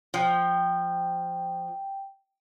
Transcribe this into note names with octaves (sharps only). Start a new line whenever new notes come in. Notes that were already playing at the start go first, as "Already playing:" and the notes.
F3 G5